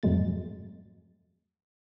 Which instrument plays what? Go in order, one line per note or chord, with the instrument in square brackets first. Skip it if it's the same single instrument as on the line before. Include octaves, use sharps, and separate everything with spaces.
[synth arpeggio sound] F2 G#2 F#3 G#3 A3 A6